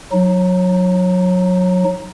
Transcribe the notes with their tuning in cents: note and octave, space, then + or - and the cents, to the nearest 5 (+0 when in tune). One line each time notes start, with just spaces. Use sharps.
F#3 -25 D#4 +0